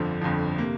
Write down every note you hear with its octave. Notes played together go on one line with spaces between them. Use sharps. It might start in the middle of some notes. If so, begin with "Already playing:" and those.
Already playing: G1 F2 D3 F3
G1 F2 D3 F3
C3 A#3